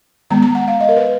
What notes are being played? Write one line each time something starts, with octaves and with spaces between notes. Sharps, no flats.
D#3 G#3 B3 A#5
A#5
F#5
F5
D#5
A#4
B4